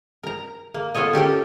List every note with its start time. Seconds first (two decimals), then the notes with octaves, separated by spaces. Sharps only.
0.23 A#4 A#5
0.74 A#3
0.94 B3 F4 A4 C#5 D#5
1.13 C#4 G4 A4 A#4